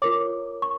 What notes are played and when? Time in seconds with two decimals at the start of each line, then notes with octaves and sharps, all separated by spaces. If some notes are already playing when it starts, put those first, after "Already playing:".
0.02 F4 A#4 C#5 D6
0.62 C#6